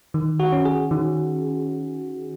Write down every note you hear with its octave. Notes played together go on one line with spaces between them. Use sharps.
D#3
F#4
C#4
G#4
D#3